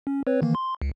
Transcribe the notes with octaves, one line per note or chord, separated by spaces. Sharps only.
C#4
C4 B4 C#5
D#3 E3 A#3
C6
C#2